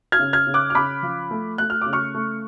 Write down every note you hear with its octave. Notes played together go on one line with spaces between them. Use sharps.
F6 G#6
C#3
F6 G#6
C#3
D6 F#6
F6
C#3 B5 D6
F3
A3
A3 F#6
F6
C#3 D6
C#6 F6
A3